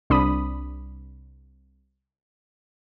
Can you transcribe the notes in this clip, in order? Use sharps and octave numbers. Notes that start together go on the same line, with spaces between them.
C2 D4 B5 D#6